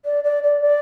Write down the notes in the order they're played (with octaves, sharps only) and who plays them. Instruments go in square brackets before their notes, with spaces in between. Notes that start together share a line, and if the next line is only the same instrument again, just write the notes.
[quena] D5
D5
D5
D5